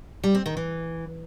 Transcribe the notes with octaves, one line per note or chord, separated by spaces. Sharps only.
G3
C4
D#3
E3